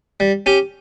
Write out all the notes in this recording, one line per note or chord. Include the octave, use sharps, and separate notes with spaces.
G3
C#4 G4